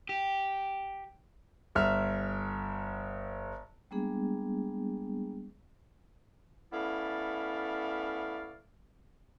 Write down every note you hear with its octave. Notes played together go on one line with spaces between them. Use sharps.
G4
G1 E5 F6
G3 G#3 A#3 B3 D4 G#4
A3 B3 C#4 E4 D5 F5